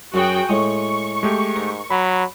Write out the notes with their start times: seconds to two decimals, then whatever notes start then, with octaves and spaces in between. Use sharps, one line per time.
0.14 F#2 F#4 G#4 G5
0.49 A2 G#3 C#6 D#6
1.23 G#3 A3 G4
1.56 G#2 A#4
1.90 F#3 B5